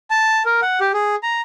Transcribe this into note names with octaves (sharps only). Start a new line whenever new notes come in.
A5
A#4
F#5
G4
G#4
A#5